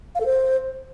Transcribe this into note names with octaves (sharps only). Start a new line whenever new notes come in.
F5
A4
C5